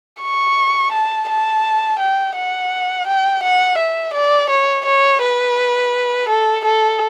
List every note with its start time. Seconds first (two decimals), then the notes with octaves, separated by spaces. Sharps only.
0.22 C#6
0.92 A5
1.29 A5
2.00 G5
2.36 F#5
3.07 G5
3.44 F#5
3.78 E5
4.14 D5
4.50 C#5
4.86 C#5
5.22 B4
6.29 A4
6.65 A4